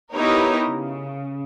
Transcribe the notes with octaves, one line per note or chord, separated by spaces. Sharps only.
B3 D#4 E4 G4 A#4 C#5
C#3